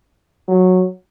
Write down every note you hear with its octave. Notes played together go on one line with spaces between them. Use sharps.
F#3